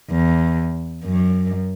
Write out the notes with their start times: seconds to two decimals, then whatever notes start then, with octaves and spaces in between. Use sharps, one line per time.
0.11 E2
1.04 F#2